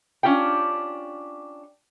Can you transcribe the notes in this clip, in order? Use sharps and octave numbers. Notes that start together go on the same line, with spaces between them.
C#4 D4 F4 G4 G5